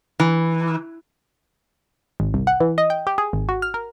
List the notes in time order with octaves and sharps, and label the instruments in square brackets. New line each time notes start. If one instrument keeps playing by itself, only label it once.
[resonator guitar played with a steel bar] E3
[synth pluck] G#1
C2
F#5
E3
D#5
G5
G4
G#4
G#1
F#4
F6
A#4